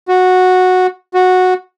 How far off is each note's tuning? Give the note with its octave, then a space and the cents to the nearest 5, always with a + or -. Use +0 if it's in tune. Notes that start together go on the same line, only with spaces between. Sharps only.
F#4 -10
F#4 -10